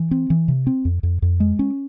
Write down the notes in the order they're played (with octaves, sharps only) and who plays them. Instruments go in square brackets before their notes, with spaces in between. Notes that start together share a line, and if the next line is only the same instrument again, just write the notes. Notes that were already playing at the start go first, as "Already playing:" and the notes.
Already playing: [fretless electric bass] E3
C4
E3
C3
C4
F2
F2
F2
G#3
C#4